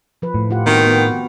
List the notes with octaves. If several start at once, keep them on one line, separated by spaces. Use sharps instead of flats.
F3 B4
A2
F4 G4 F#5
D#3 B3 C4 F#4
B3